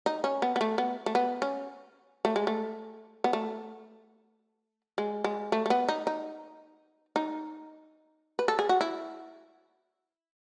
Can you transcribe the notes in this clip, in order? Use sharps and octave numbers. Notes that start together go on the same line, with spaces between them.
D#4
C#4
B3
B3
A3
B3
A3
B3
C#4
A3
G#3
A3
B3
A3
G#3
G#3
A3
A3
B3
D#4
D#4
D#4
B4
A4
G#4
F#4
E4